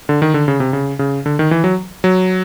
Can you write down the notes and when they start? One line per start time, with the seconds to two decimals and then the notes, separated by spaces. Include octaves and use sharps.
0.09 D3
0.22 D#3
0.34 D3
0.48 C#3
0.60 C3
0.73 C#3
0.99 C#3
1.26 D3
1.39 D#3
1.51 E3
1.64 F#3
2.04 F#3